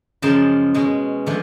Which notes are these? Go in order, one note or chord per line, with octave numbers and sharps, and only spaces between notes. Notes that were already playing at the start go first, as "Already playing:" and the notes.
F#2 C#3 F3 G#3 A5
B2 G#3 C#4
D3 F3 A3 F#5